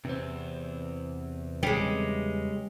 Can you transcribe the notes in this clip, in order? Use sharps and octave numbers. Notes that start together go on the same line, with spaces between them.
E2 C3 C4
C#3 G3 G#3